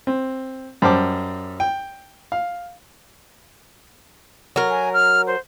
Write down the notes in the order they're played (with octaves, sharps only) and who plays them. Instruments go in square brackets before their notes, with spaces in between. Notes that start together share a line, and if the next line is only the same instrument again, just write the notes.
[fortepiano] C4
F#2 G3 C5 A5 D6
G5
F5
[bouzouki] F#3 A#4
[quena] G#5
F6
C5